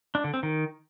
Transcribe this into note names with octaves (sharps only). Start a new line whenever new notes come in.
D4
D3
C4
D#3